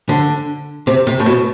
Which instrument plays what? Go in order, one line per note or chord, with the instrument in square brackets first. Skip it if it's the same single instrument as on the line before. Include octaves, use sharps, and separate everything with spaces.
[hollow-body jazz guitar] D3
C3
C3
A2
B2